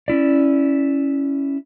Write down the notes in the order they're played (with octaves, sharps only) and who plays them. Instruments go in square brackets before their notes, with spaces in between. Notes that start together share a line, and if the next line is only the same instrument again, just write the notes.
[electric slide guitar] C#4 E4 D5